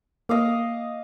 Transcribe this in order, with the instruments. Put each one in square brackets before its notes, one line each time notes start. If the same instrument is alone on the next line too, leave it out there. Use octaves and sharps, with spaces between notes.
[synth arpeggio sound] A#3 [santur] D#5 F5 D6